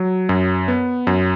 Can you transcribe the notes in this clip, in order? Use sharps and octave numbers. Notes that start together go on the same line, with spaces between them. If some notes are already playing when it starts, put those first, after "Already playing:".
Already playing: F#3
F#2
B3
F#2